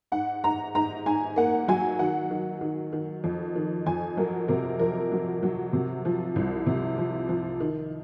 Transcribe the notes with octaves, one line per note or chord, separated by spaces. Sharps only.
G#2 F#5
G#2 A#5
G#2 A#5
G#2 G#5
A#3 F#5
F#3 G#5
D#3 F#5
D#3
D#3
D#3
F2
D#3
F2 G#5
F#3 A#4
C3 A#4
F2 A#4
F#3
F#3
C3
F3
C2
C3
F3
F3
D#3